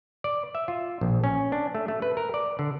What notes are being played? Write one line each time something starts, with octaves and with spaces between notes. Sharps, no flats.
D5
E5
F4
A#1
C#4
D4
A3
A3
B4
A#4
D5
D3